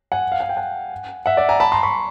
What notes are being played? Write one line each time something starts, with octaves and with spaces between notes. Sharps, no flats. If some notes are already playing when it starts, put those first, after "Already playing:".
F#5 G#5
F5
F#5
G5
F#5 G#5
E5 F#5
D5 E5
G#5 A#5
A5 B5
A#5 C6
B5 C#6